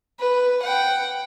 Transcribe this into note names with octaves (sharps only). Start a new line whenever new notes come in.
B4
F#5 G5